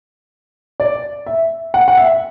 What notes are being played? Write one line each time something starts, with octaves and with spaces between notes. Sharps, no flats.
D5
E5
F#5
F#5
E5